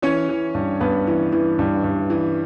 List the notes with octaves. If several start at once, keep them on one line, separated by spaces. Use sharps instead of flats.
E3 C#4 C#5
E3
G2
G2 B3 B4
E3
E3
G2
G2
E3